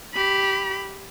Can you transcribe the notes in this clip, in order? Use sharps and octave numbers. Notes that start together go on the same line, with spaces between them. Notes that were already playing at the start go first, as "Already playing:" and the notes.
G4 B5